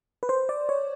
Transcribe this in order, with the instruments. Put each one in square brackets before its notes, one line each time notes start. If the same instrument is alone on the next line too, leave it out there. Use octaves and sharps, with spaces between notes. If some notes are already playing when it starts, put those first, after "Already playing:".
[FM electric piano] B4
C5
D5
C#5